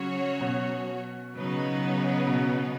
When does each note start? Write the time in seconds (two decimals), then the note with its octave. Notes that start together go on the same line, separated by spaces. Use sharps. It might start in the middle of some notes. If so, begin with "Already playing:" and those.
Already playing: C#3 F#3 C#4 F#4 C#5
0.40 B2
1.35 C#3 F#3 B3 D#4 B4
2.27 B2